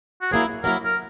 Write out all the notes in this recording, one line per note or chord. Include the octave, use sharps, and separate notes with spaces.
F#4
F#3 A#3 E4 G#4
F#3 A#3 E4 A#4
A#4